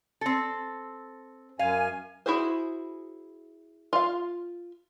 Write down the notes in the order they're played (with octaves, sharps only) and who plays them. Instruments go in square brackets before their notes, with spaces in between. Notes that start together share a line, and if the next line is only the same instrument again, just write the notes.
[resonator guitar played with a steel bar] C4 A4
[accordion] F#2 G#5 [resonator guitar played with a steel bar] F5
[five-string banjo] E4 F#4 G#4 C5
F4 F5